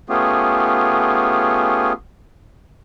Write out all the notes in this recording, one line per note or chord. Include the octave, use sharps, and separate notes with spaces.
A3 B3 C#4 F4 G4 G#4